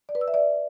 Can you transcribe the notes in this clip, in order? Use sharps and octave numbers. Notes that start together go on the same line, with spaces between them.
D5
B4
E6
E5
D5